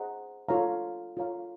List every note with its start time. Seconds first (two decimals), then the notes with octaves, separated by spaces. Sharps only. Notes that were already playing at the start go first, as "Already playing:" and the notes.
Already playing: G#4 C5 D#5 F#5 A#5
0.48 F4 A4 C#5 F5 A#5
1.17 F4 A4 C#5 F5 A#5